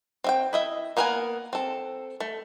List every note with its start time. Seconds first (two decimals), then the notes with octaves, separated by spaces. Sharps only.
0.24 C4 E5 G5
0.53 E4 D#5 E5
0.97 A#3 B3 A#4 F#5 G#5
1.53 C4 A4
2.20 A3